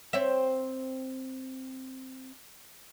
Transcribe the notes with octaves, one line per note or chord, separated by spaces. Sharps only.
C4 C#5 E5